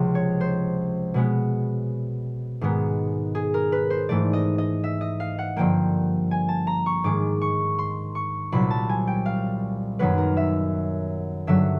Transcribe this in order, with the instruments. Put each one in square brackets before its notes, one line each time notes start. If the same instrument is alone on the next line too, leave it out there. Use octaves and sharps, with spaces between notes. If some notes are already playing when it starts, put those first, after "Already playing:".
Already playing: [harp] C#2 C3 F3
C#5
C5
B2 G#3 B3
G#2 D#3 G#3 B3
G#4
A#4
B4
C5
G#2 E3 A3 D5
D#5
D#5
E5
D#5
F5
F#5
G2 D3 F3 A#3 G5
G#5
A5
A#5
C#6
G#2 D#3 G#3 D6
C#6
C6
C#6
C2 A#2 F#3 B5
A5
G#5
G5
F5
F#2 D#3 F#3 B3 B4
A#4
E5
G2 D3 F#3 E5